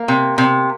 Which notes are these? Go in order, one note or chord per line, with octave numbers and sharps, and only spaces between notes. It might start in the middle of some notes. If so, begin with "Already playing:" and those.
Already playing: A#3
C3
C3